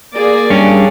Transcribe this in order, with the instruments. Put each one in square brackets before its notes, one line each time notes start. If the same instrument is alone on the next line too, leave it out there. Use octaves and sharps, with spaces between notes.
[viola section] A#3 G#4 D5
[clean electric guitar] G2 C#4